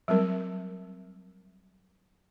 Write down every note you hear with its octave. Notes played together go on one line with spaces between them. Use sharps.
F#3 G3 C4 A#4